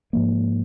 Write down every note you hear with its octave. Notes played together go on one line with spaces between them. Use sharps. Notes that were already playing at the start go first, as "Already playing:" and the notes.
G#2 F3 A#3